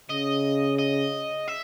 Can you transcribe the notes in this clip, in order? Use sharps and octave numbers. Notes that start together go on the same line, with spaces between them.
C#3 D#5
D#5
E5